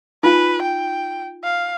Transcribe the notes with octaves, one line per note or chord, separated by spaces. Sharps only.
D#4 F4 B4 G#5
G5
F5